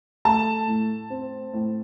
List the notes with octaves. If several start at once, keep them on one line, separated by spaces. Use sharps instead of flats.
A3 A5
A2
C4
A2